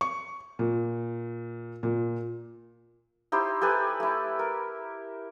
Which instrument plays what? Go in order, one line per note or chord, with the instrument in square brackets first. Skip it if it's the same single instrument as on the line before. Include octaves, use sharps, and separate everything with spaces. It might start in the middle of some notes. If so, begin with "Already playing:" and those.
[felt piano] C#6
A#2
A#2
[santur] D#4 E4 G4 C5
G4 A4 B4 G#5
A3 E4
A#4